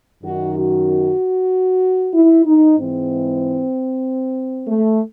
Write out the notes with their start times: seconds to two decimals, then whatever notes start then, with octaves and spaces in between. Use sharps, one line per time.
0.24 F#2 D#3 F#4
0.56 F#4
2.15 E4
2.46 D#4
2.78 G#2 E3 C4
4.67 A3